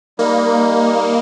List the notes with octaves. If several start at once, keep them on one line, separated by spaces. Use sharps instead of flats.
G3 A#3 D#4